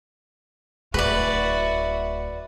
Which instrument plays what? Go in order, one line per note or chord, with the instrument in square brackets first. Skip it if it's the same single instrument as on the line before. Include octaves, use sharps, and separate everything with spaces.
[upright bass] D1 E4 [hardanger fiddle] F#4 E5 [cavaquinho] B4 D5